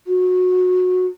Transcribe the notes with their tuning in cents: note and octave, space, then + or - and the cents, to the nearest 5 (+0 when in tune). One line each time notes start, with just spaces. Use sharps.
F#4 -20